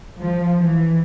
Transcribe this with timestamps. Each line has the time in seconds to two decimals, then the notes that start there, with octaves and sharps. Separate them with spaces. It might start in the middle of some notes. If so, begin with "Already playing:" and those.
0.19 F3
0.59 E3